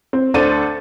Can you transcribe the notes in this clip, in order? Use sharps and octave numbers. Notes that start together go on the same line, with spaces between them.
C4
D2 D4 A4 C5 A6 D#7